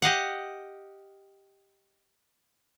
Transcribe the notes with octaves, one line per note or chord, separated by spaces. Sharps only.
G4 D#5 F5 F#5